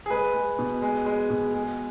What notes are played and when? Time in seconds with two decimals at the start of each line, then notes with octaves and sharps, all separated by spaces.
0.06 G#4
0.10 G#3 B4
0.34 G#3
0.59 B2
0.82 G#3
1.06 G#3
1.30 B2
1.54 G#3